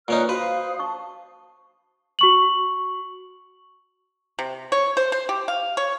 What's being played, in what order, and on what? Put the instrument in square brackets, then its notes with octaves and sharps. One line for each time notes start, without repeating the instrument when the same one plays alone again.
[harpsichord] A#2 C#4 D#4 [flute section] B4 F6 F#6
[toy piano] F#4 [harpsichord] B4 [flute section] C5 F5 D#6
[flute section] A5 [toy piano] C#6
[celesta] F#4 C#6 F#7
[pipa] C3
C#5
C5
C5
G4
F5
C#5